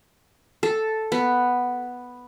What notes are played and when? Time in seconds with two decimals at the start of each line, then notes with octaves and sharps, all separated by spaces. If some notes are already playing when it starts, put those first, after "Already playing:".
0.63 A4
1.12 B3